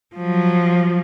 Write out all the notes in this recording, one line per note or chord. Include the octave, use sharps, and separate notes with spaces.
F3 F#3